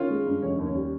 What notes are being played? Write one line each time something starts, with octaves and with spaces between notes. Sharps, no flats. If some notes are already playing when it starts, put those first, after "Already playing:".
Already playing: D#3 C#4 F4
G#3
G2
F1 C#4
D#2
C#4
G3